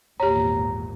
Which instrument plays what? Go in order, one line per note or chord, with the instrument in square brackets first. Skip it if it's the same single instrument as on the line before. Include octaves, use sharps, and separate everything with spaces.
[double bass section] G#1 E2 A#2 [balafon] G4 C#5 [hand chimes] A#5